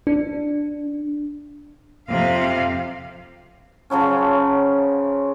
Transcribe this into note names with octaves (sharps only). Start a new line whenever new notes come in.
D4
F2 C3 F5
C#3 F3 F#3 C#4